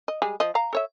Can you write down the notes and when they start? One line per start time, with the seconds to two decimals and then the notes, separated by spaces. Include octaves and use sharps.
0.08 D#5
0.22 G3 G#3 G#4
0.40 F3 D#5
0.55 F5 A#5
0.73 A4 C#5 E5